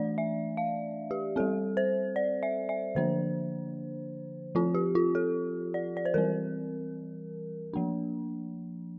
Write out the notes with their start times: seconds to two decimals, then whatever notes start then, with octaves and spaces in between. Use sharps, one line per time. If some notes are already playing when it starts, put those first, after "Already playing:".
Already playing: E3 A3 D4 D5
0.18 E5
0.57 F5
1.11 G4
1.36 G3 C4 A4
1.77 C5
2.16 D5
2.43 E5
2.69 E5
2.95 D3 F3 A#3 D4 C5
4.55 F3 C4 F4
4.75 G4
4.95 F4
5.15 A4
5.74 D5
5.97 D5
6.05 C5
6.14 E3 G3 C4 A#4
7.73 F3 A#3 D4